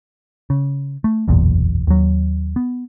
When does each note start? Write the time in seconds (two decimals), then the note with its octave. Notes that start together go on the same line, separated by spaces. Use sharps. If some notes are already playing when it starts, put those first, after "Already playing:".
0.50 C#3
1.04 A3
1.28 F#1 B1 E2 A#2
1.87 D#2 F#3
2.56 B3